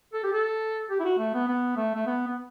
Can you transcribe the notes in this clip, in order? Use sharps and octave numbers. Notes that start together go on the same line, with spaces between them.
A4
G4
A4
G4
E4
F#4
A3
B3
B3
A3
A3
B3
B3